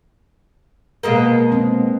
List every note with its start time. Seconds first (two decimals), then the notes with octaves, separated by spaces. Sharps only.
1.03 B2 G#3 A#3
1.52 C4